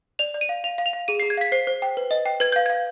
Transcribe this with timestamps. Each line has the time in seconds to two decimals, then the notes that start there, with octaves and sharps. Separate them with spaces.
0.19 D5 F7
0.34 D5
0.41 D#7
0.49 F5
0.64 F5 F7
0.78 F5
0.86 F7
0.93 F5
1.08 G#4 D#7
1.20 G#4 C7
1.30 G#6
1.37 F5 B6
1.52 C5 C7
1.67 C5
1.82 G5
1.97 B4
2.11 D#5
2.26 G5
2.40 B4 G#6
2.52 F5 G6
2.66 F5 G#6